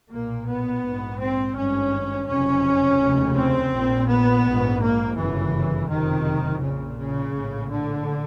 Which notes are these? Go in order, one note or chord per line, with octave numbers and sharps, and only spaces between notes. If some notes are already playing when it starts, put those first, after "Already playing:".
B1 A#2 A#3
B3
A#1 G#2
C4
G#1 G2 C#4
F#1 F2 C3 C#4
F1 D#2 C#3
C4
A#1 A#2
B3
A#1
G#2
A#3
G1 F#2 C#3 E3
F#1 F2 C3 D#3
A#1 A#2 C#3
C#3
A#1 A2
D3